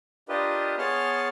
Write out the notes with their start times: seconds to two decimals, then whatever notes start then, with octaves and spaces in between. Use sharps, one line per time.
0.29 D4 F4 G4 A#4 B4 D#5
0.78 B3 G#4 C#5 A5 C6 F6